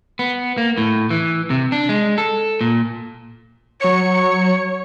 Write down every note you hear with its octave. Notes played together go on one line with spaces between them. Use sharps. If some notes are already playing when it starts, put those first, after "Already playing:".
B3
A#3
A2
E3
C3
D4
G#3
A4
A#2
F#3 C#5 C#7